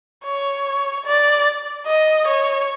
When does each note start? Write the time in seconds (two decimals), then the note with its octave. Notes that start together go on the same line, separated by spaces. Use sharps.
0.25 C#5
1.06 D5
1.87 D#5
2.27 C#5